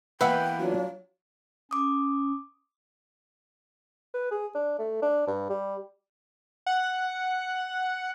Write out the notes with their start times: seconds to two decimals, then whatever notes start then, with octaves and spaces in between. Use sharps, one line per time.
0.21 E3 A#3 B3 B4 E5 F#5 G5
0.60 F#3 D4 F4
1.71 C#4 D6 D#6
4.14 B4
4.31 G#4
4.55 D4
4.79 A3
5.02 D4
5.27 G2
5.49 G3
6.66 F#5